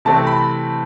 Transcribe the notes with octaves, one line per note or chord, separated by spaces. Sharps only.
C3 E3 A3 C4 A5
B5